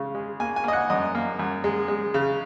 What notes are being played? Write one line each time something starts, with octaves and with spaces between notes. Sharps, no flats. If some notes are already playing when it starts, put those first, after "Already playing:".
Already playing: C#3 G#3
G#3
A#3 G#5
G#5
A#3 D#5
F#5
F#2 D#5
A#3
F#2
G#3
G#3
C#3